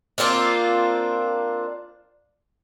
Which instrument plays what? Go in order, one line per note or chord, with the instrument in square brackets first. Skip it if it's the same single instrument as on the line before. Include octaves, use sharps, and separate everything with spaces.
[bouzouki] A#3 C4 D4 F4